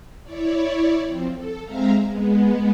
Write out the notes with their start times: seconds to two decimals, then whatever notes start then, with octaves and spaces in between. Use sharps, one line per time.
0.23 E4 C#5 D5
1.04 F3 C4
1.34 A4
1.64 G#3 C4 E5 F5 A#5
2.04 G#3 B3